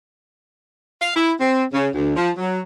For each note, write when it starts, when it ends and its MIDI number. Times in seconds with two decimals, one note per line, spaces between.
1.01 1.14 77
1.15 1.31 64
1.40 1.64 60
1.73 1.88 49
1.93 2.13 38
2.16 2.30 53
2.37 2.59 54